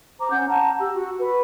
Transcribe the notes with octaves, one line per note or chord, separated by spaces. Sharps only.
C5 A#5 D6
C#4 F#5 G6
F#5 A5 A#5
G4 E6
F#4
F#4 B4